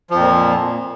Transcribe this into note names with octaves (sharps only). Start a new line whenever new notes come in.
F2 A#2 F3